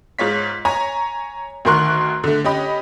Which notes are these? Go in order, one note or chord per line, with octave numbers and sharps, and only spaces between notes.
G#2 F4 C#5 B6
C#5 G#5 A#5
D2 D#3 A#4 C6 C#6 F#6
D3 A3
C#4 G4 D#5 B5